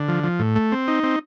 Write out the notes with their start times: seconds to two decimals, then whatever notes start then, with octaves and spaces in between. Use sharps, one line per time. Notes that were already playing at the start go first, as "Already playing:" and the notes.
Already playing: D3
0.08 F3
0.24 F3
0.39 A2
0.56 A3
0.72 C4
0.88 D#4
1.03 C4